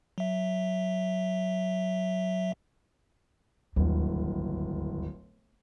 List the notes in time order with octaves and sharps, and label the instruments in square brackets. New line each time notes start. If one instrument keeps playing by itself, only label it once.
[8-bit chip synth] F#3 E5
[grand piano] D1 G1 [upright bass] D#2